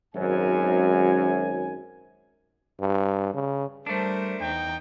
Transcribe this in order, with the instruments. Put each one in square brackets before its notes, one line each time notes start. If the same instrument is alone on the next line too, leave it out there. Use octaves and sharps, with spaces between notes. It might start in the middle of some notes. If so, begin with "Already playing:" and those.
[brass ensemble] G#1 F#2 G#5
[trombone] G2
C#3
[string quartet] G3 A#4 C5 [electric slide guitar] A3 D4
[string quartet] E2 D#4 [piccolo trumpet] G5